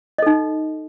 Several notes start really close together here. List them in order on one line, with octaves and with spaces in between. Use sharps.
D#5 A4 D#4